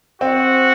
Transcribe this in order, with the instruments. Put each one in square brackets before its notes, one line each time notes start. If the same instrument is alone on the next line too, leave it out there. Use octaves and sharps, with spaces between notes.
[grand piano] C4 [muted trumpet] F#4